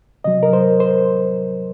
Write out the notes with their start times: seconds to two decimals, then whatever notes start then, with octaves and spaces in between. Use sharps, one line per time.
0.24 C3 F#3 D#5
0.43 A#4
0.53 C5
0.80 C5